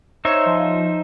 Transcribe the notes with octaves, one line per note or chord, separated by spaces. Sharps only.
D#4 C5 C#5 E5
F3